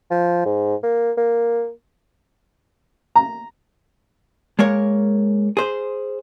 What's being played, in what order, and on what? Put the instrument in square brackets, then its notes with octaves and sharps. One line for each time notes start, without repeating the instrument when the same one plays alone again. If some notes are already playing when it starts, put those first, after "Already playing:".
[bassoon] F3
G#2
A#3
A#3
[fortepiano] A#5
[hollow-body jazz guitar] G#3 A#3 A#4 C#5
G#4 C5